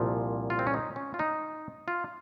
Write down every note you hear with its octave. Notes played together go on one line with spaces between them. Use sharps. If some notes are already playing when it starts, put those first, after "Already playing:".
Already playing: C2 A#2 F3
F4
C4
C#4
D#4
C#4
F4
D#4
F4